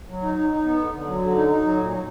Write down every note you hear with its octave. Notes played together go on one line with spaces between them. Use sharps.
F#3
D#4
D#4
D#4
B3
D3
D3
F#3
D3
D#4
D#4
F#3
A#2
F#3